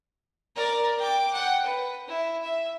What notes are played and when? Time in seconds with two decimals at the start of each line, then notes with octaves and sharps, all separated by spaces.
0.55 A#4 D5
0.98 G5 D6
1.33 F#5 G5
1.65 B4
2.08 E4
2.42 E5